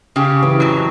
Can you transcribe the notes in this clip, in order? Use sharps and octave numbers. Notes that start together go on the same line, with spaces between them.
C#3 G4
E3
F2 F#3